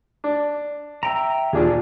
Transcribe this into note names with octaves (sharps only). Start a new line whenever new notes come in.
D4
E5 G5 A#5
A#1 D#2 D4 F4 G#4